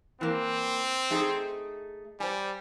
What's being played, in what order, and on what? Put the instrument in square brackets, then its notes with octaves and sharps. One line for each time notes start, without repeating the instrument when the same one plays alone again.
[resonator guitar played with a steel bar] E3 A#3 [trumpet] C4
[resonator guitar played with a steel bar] A3 D#4 G#4
[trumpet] G3 [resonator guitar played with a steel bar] C5 G#5